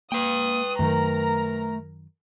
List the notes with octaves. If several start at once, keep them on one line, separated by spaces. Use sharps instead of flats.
A#3 B4 G5 D#6
F#2 D#3 A3 A#4 A#5